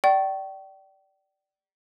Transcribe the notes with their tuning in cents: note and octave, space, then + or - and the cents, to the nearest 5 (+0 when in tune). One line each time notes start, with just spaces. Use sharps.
D5 +0 G5 -35 C#6 -15